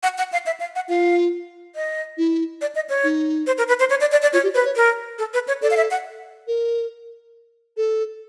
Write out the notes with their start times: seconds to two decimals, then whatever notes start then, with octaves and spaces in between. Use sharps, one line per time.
0.03 F#5
0.18 F#5
0.32 F5
0.46 E5
0.60 F5
0.75 F#5
0.89 F4 F5
1.75 D#5
2.18 E4
2.61 D5
2.75 D#5
2.89 C#5
3.04 D#4
3.47 C5
3.58 A#4
3.68 B4
3.80 C5
3.90 C#5
4.01 D5
4.12 D5
4.22 D5
4.33 F4 C#5
4.43 G4
4.54 B4 C5
4.65 C#5
4.76 A#4
5.19 A4
5.34 B4
5.48 C#5
5.62 A4 D5
5.71 F5
5.77 E5
5.91 F#5
6.47 A#4
7.77 A4